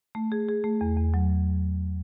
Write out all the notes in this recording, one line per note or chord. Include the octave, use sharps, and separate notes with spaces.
A3
G#4
G#4
A3
E2
E2
F#3